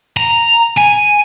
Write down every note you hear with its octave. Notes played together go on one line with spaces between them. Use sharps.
A#5
G#5